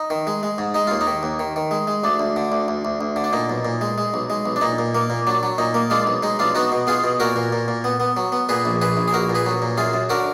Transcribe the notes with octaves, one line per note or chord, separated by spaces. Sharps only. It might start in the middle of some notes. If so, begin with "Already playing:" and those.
Already playing: D#4
D#3
G#3
G#3
G#2
G#3 D#4
D#2 F4
D#4
D#3
D#2
D#3
D#3
G#3
G#3
D2 D4
D2
D3
D2
D2
D2
D2
D3
D4
A#2 D#4
B1
A#2
G#3
G#3
B1
G#3
B1
D4
A#2 D#4
A#2
A#3
A#2
F#3 D4
F#3
A#2 D#4
A#3
G#3 D4 F4
B1
G#3 D#4
B1 D4 F4
B3 D#4 F#4
B2
B3 F4 G#4
B2
A#2 F#4 A#4
A#2
A#2
A#2
B3
B3
F#3
B3
A#2 G#4 B4
A#1
A#1 G#4 B4
A#1
G#4
A#1 F#4 A#4
A#2
G#4 B4
F#3
A#2
F#2 F4 G#4
F#2
D3 F#4 A#4